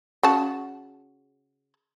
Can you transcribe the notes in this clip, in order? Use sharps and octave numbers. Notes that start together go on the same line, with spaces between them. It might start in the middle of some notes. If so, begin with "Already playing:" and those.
C#3 F#4 A5